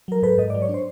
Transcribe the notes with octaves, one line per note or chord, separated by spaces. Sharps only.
F#3 A#4
G#2 A4 B4
G#2 D#5
F#3 D5
C#5
D4
C5